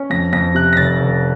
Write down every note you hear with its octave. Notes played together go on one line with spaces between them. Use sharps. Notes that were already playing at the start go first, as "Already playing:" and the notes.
Already playing: C#4
F2 A#6
F2 A#6
C3 F#6
A#6
F1 A6
F1